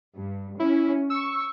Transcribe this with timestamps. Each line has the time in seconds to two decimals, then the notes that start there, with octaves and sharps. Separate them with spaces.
0.15 G2
0.59 C#4 E4
1.10 C#6 E6